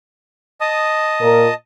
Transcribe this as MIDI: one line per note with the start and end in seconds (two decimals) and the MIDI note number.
0.61 1.54 75
0.61 1.54 81
0.61 1.54 87
1.21 1.47 46
1.21 1.47 70